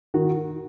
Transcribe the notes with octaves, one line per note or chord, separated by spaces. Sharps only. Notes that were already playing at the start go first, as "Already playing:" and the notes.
D#3 F#4